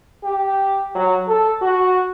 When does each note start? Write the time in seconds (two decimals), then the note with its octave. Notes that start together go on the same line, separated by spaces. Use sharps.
0.24 G4
0.95 F#3
1.28 A4
1.62 F#4